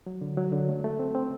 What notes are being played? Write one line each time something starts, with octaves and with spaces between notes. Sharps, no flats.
F#3
D3
F#3
D3
A3
A3
C4
C4